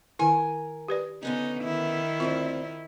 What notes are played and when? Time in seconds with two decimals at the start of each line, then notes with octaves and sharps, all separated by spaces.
0.19 D#3 E4 A#4 G#5
0.88 G4 B4 D5
1.23 D3 B3 C#4 D#4
1.63 D#3 E4
2.20 D2 G2 C4 F4